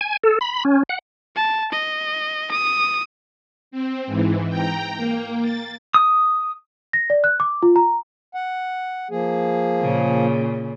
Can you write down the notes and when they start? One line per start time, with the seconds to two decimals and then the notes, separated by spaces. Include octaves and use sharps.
0.01 G#5
0.23 A4
0.41 B5
0.65 C#4
0.89 F#5
1.36 A5
1.72 D#5
2.51 D#6
3.71 C4
4.06 G#2 E3
4.49 G5 A#5
4.97 A#3
5.42 A6
5.94 D#6
6.93 A#6
7.10 D5
7.24 F#6
7.40 D6
7.63 F4
7.76 A#5
8.34 F#5
9.11 F3 A#3 G#4
9.82 A#2 C#3